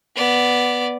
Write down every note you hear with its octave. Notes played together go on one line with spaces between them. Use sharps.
B3 D5